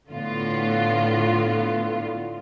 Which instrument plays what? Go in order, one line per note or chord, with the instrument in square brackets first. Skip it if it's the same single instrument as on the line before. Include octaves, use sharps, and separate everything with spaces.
[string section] A2 D3 B3 F4